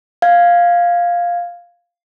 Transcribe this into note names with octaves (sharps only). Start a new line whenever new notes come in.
F5 G#6